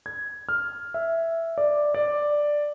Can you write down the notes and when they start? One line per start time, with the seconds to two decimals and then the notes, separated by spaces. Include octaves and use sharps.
0.06 G#6
0.49 F6
0.94 E5
1.58 D5
1.94 D5